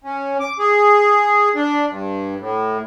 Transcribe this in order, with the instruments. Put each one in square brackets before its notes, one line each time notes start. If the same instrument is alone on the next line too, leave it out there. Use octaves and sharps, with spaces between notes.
[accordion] C#4
D6
G#4
D4
G2
A2